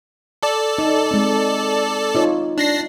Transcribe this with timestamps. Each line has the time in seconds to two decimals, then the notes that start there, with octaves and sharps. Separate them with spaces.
0.43 A4 D5
0.78 D#4
1.11 G#3 C4
2.15 D#4 F4 C#5
2.58 D4 A#6 C7